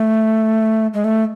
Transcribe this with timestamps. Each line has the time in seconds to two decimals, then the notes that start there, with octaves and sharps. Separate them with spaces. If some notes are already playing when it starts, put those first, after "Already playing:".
Already playing: A3
0.94 G#3
1.04 A3